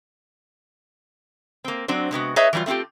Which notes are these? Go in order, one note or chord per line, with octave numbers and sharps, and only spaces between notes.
A#3 C4
F#3 C4 D4 C5
C3 G#3 B3 F#4
G#4 B4 C#5 D#5 E5 A#5
E3 F#3 G3 D#4 F4
A3 C4 E4 F4 G4